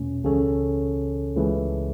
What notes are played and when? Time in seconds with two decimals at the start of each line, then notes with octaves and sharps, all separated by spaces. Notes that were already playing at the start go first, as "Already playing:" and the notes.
Already playing: E2 B2 A3 C#4
0.24 C#2 C#3 E3 C#4 A4
1.36 C#2 C#3 E3 A3